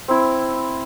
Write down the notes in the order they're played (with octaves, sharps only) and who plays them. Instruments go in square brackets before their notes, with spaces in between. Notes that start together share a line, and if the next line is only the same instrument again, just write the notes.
[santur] C4 E4